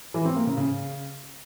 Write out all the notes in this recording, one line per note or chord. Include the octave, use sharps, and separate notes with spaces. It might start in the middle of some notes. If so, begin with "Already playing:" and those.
E3
C4
A#3
C#3
C#3